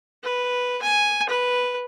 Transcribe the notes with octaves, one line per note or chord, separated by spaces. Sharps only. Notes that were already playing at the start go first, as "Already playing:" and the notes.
B4
G#5
B4